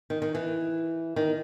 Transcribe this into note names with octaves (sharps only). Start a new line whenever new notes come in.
D#3
D#3
E3
D#3